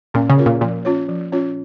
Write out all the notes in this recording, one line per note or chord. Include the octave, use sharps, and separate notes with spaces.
A#2 C#4
C#3
F4 A#4 C#5
A#2
A#2 F3
C#4 F4 C#5
F3
C#4 F4 C#5